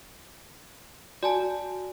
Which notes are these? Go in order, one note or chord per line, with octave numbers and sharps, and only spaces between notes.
F#4 D5 G#5 A5